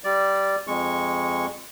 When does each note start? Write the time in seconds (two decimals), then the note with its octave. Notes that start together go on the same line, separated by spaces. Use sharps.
0.04 G3 D5
0.67 F2 G#3 C#6